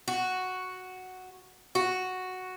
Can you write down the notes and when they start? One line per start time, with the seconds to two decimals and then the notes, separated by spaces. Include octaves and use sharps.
0.08 F#4
1.75 F#4